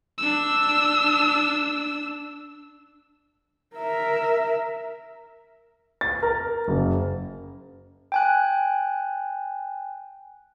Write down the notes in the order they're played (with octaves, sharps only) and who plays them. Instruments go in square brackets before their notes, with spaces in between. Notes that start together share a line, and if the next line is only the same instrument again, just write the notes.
[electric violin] D4 E6
[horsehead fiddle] A#4 E5
[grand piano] A6
A#4
F#1
[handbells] G5 G#5 F#6